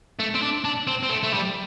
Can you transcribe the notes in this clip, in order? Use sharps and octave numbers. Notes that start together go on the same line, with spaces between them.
A3
C4
D4
D4
C4
C4
A3
A3
G3